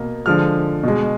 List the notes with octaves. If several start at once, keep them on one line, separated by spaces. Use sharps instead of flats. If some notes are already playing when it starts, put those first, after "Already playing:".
Already playing: B2 A#3
D3 F3 G#3 F6
B2 G#3